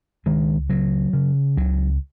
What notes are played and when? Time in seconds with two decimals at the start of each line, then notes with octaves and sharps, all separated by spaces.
0.26 C#2 D#3 G#3
0.70 C#3 F#3
1.13 C#3
1.57 C#2 F#3